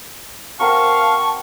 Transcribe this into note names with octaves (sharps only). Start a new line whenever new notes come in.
C4 F#4 A#4 F5 A5 C#6